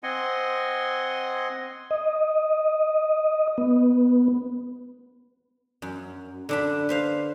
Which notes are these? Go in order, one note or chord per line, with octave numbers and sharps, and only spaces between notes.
C4 D#5 F#5 G#5 C6
D#5
B3
F#2
D3 D4 B5
B4 C5 F5